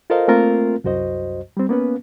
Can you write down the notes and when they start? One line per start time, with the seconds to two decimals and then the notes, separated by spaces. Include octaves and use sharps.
0.10 F4 A4 A#4 C5 D#5 F5
0.28 A3 A#3 C4 F4 A#4
0.84 C2 F#2 F#4 C5 D#5
1.57 G3 C4
1.69 A#3 B3 C#4 B4